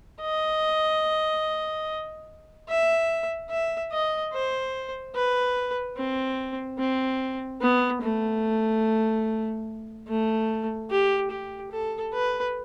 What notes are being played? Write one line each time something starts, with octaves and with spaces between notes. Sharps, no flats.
D#5
E5
E5
D#5
C5
B4
C4
C4
B3
A3
A3
G4
G4
A4
B4